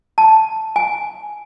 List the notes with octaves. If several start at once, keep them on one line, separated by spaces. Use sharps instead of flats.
A5
G#5